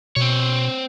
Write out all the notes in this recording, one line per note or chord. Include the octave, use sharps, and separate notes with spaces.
B2 C4 C#5